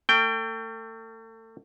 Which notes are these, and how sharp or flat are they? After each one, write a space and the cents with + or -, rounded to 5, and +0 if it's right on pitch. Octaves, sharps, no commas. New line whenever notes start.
A3 +35 G5 +0